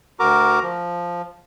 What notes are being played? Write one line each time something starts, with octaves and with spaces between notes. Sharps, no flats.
D2 F#4 A#4 A#5 D6
F3